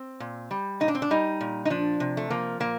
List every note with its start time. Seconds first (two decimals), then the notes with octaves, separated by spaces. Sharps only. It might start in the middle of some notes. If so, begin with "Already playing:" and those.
Already playing: C4
0.20 A#2
0.51 G3
0.80 A#2 D#4
0.88 D4
0.95 C4
1.02 D4
1.11 G3 D#4
1.41 A#2
1.65 D#4
1.70 F3 D4
2.00 C3
2.17 A3
2.30 F3 A#3
2.60 A#2 A#3